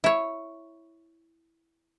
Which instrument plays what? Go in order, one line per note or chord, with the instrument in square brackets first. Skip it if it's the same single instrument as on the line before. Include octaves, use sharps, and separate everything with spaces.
[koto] E4 C#5